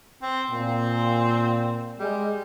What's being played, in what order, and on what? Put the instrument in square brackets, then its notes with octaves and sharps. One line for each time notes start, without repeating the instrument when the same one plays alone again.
[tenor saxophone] C4
[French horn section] A#2 [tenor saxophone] C4
[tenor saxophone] G3 [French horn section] G#3